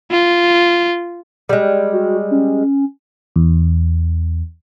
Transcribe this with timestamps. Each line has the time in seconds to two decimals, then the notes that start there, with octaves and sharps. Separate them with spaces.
0.11 F4
1.49 G3 G#3
1.93 F#4
2.31 C#4
3.36 E2